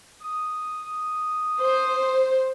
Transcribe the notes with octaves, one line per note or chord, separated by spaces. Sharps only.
D#6
C5